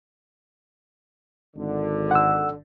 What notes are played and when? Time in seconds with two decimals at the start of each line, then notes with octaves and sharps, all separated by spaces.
1.56 G#1 D3
2.11 F#5 E6